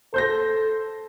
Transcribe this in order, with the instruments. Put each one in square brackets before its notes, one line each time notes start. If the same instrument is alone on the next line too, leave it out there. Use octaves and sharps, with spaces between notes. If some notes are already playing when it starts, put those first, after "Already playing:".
[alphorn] A4 [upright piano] C5 G6 A#6